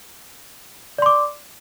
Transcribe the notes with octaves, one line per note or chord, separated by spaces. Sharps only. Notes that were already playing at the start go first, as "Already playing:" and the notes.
D5 C6 D6